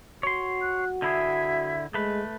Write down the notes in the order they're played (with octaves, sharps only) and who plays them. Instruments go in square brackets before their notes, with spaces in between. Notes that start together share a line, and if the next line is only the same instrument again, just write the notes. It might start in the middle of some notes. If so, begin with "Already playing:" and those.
[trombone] F#4 [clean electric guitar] C#5 C6
[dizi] F#6
[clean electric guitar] D3 E4 G#4 [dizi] E5
[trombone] G#3 [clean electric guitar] A3 B4